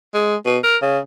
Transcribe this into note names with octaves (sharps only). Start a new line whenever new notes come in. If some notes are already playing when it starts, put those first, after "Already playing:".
G#3
B2
A#4
C#3